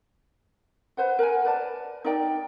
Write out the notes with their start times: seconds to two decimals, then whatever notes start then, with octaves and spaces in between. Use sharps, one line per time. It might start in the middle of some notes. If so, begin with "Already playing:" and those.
0.97 B4 C5 F#5
1.19 A#4 F#5 G#5
1.45 B4 D5 A5
2.05 D#4 A#4 D5 G5